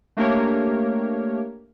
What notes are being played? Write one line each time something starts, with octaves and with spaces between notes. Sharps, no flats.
A3 A#3 D4 G4 A#4 C#5